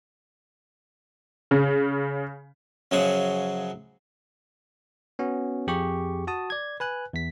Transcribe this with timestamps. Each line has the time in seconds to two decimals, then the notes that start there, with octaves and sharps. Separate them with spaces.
1.51 C#3
2.91 F#2 C#3 F3 F#3 G#4 F#5
5.19 B3 C#4 F#4
5.67 F2 G4 G#4 C#6
6.27 F#4 A5 D#6
6.50 D5 G#6
6.80 B4 G#5 F#6
7.13 E2 B6